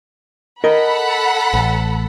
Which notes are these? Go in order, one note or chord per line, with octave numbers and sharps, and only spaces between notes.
A4 A#4 D#5 F#5 B5
A1